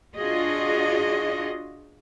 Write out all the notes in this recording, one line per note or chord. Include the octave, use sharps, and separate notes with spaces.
D4 F4 F#4 G#4 D#5